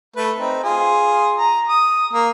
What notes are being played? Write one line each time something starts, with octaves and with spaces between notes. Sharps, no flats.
A3 B4
C4 D#4
F4 G#4 C6
A#5
D#6
A#3